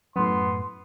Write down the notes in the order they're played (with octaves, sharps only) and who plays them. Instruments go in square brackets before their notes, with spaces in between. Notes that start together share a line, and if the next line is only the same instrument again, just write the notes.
[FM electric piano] F#2 A2 [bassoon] B3 [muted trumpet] C6